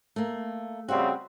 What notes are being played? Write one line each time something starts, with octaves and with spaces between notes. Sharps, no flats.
A3 A#3
C#3 G3 C4 F#4 E5 F#5